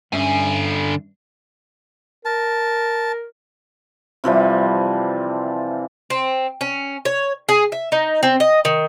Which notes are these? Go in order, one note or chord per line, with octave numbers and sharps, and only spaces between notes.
G2 D3 C#4 E5 G#5
A#4 A5
C3 E3 F3 G3
C4
C#4
C#5
G#4
E5
D#4
C4
D#5
D#3